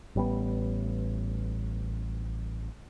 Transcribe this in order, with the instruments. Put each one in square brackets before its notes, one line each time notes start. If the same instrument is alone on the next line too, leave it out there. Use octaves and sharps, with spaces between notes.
[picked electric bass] A1 G3 B3